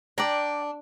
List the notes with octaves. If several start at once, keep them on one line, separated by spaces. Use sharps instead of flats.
D4 D5 G5 A#5